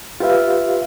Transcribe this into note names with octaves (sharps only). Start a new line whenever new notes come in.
F4 G4 B4 E5 F5